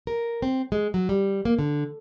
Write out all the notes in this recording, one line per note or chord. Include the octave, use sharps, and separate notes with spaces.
A#4
C4
G#3
F#3
G3
A#3
D3